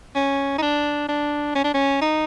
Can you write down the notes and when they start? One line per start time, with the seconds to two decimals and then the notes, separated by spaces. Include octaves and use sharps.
0.15 C#4
0.58 D#4
0.62 D4
1.08 D4
1.55 C#4
1.64 D4
1.74 C#4
2.01 D#4